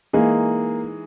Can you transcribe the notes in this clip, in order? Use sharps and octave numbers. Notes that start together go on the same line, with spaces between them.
E3 G#3 A#3 D#4 G#4